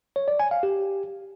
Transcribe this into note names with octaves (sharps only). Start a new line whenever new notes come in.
C#5
D5
G#5
F5
G4